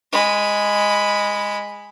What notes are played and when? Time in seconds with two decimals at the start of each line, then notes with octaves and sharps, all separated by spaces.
0.12 G#3 B5